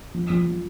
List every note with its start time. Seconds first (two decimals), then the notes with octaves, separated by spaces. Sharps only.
0.14 F3
0.30 F3
0.47 F3